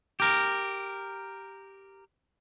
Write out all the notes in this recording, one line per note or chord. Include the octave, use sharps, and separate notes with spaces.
G4 A#4